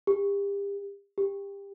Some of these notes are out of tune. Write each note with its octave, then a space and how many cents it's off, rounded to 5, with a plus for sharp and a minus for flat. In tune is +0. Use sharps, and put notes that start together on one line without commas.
G4 +35
G4 +25